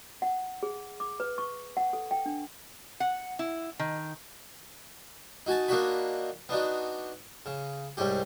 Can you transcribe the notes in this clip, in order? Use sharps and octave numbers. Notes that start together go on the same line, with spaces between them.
F#5
G#4
D6
B4
C#6
F#5
A4
G5
D4
F#5
E4
D#3
D#4 F#4 G#5 A5
A#3 D4 D#4 F#4 C#5 B5
B3 D4 D#4 F#4
C#3
C2 G#2 G3 C#4 G4